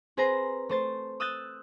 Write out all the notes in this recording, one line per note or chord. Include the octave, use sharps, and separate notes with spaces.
C4 G#4 B4 C5 A#5
A3 C5 A6
D#6 E6 F#6 G6 A6